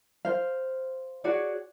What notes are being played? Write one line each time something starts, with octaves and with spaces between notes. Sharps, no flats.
C5 F5
F#4 G#4 C#5 D5